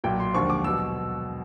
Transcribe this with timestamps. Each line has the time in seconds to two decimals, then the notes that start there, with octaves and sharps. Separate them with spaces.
0.04 B1 A#2 F#3 G5
0.20 C6
0.34 E1 D#2 D3 F3 C#6
0.50 D6
0.64 B2 F#3 E6